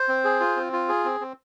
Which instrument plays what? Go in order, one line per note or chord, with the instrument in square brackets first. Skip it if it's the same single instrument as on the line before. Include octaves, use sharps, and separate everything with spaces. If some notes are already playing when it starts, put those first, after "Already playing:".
Already playing: [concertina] C5
C4
G#4
F4
C4
F4
G#4
C4
C4